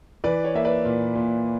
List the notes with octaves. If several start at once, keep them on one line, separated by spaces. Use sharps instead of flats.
E3 B4 D5
C#5
A#3 E5
B4 D5
A#2
A#2